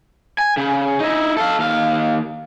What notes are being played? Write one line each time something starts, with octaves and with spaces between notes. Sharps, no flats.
G#5
C#3
D#4 E4
A4 F5
D#2 F5